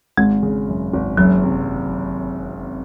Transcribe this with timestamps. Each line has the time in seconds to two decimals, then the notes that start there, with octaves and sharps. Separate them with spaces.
0.18 G#1 G#3
0.43 C#3
0.68 F#2
0.93 G#1
1.17 F#1 F#3
1.43 C3